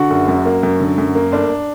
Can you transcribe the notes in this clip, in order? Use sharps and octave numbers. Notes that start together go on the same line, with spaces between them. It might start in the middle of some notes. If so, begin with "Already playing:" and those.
Already playing: D3 F#4
F#1
F#2
A#3
F#2
D3
F#2
A#3
G1 D4